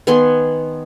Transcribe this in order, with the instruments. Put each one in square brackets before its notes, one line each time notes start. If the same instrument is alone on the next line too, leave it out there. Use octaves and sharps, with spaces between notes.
[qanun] D#3 B3 G#5 C6